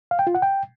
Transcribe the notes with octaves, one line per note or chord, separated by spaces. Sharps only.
F5
G5
F4
F#5
G5